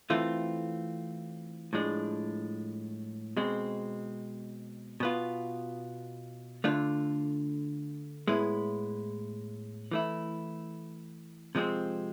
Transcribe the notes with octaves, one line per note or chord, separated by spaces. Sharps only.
E3 A3 C4 F4
A2 F3 G#3 D4
B2 G#3 C4
B2 B3 F4
D3 A3 D4 F4
A2 G#3 B3 E4
E3 A3 E4
C3 F3 G#3 C4